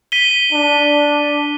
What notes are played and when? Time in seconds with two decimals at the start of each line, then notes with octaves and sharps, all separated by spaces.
0.12 B6 D#7 G7
0.52 D4